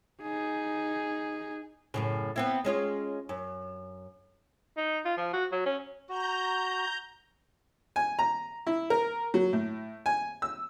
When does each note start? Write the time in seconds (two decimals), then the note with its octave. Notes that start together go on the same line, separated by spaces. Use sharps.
0.22 D#4 G#4
1.94 F#2 A2 C#3
2.36 B3 C4 E4
2.65 G#3 C#4 F4
3.29 F#2
4.78 D#4
5.05 F4
5.17 F3
5.33 F#4
5.52 F#3
5.66 C#4
6.09 F#4 A#5 G6
7.96 G#5
8.19 A#5
8.67 E4
8.90 A#4
9.34 F#3
9.53 A2
10.06 G#5
10.42 E6